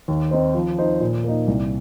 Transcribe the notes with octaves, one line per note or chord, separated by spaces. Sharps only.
D#2
D#3 C4 D#4 C5
F3
D#4 C5
A#2
A#3 D#4
C2